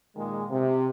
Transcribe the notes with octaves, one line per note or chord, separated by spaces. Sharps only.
A#2 D#3 G#3
C3